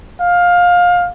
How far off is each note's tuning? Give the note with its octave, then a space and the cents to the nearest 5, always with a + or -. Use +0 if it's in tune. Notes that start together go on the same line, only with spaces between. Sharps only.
F5 +20